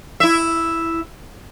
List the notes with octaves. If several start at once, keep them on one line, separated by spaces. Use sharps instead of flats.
E4 E5